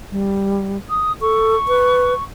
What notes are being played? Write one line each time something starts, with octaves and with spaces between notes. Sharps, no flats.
G3
D#6
A4 C#6
B4